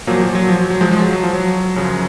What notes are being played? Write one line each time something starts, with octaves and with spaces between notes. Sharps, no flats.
A#2 F3 F#3 A#3
F3
F#3
F3
F#3
F3 G#3
F3 G#3
F#3
F#3
F3
F#3
F#2 C#3 F3